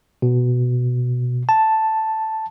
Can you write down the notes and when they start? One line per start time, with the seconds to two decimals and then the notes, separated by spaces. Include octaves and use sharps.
0.22 B2
1.49 A5